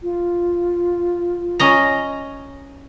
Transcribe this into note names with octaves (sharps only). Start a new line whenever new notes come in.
F4
C#4 D#5 A#5